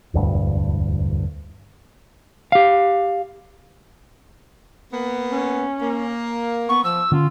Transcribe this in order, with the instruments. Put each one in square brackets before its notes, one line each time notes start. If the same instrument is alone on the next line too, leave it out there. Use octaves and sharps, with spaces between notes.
[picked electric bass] E1 D2 G2
[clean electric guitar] G4 F5
[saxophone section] A#3 B3
[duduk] C#4
[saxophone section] A#3
[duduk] B3 [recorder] C#6
[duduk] F3 [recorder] E6
[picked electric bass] D3 C#4 [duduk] F4